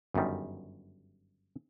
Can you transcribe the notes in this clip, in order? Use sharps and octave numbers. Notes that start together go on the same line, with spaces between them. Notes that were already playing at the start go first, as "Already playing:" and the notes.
G1 F#2 D#3 G3